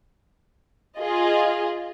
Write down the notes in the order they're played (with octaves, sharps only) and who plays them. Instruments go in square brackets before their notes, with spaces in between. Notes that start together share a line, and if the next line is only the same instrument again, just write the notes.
[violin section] F4 G#4 D#5